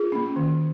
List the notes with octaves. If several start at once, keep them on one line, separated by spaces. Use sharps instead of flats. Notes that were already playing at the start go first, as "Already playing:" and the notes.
Already playing: F4 G#4
A#3 C#4
D#3